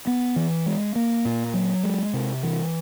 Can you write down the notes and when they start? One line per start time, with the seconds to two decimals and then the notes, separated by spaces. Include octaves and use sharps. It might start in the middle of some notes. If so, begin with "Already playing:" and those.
0.07 B3
0.36 E3
0.66 G#3
0.96 A#3
1.25 A#2
1.54 F#3
1.84 G#3
2.13 C3
2.43 E3